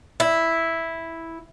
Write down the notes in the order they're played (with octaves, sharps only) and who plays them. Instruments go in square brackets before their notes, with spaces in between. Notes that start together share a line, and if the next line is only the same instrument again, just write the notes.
[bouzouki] E4